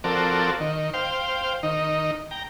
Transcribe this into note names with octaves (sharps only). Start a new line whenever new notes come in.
F3 C4 F#4 A4 A#4 D5
D#3
C5 F5 G5
D#3 D#4
G5 A#5